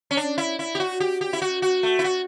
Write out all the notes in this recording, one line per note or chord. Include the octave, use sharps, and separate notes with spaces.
C#4
D4
E4
E4
G4
F#4
G4
G4
E4
F#4
F#4
A3
E4
F#4